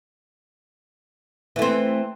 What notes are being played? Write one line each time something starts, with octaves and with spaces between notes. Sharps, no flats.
E3 A3 C4